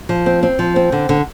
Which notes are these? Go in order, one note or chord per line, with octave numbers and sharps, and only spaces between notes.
F3
C4
C4
F3
C4
D3
D3